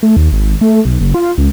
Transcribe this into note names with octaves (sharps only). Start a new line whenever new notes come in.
A3
D#2
G#1
A3
B1
F#1
F4
C#2